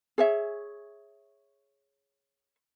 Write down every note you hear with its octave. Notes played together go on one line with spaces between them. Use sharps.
G#4 C#5 E5